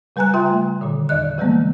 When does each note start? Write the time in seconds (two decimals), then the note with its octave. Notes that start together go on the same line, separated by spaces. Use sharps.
0.16 C#3 G3 B4 G#5 A#5 F#6
0.34 C#3 F4 E5 G5 C6
0.50 A3
0.81 A#2 D3 D#3
1.09 E2 D5 D#5 F#6
1.38 C#3 E3 G3 G#3 A#3 B3